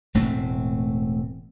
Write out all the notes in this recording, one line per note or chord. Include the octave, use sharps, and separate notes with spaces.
E1 A2 A3 C4